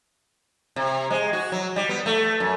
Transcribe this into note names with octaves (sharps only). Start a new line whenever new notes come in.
C3
G#3
F#4
F#3
G3
B3
A3
F#2